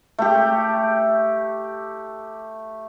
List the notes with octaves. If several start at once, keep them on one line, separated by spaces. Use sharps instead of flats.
A3 G4